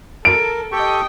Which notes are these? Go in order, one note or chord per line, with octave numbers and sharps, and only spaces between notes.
A4 A#4 D7
G4 A4 D#5 G5 C#6